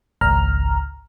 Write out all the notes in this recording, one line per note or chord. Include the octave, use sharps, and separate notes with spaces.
G#1 C#2 A#5 F6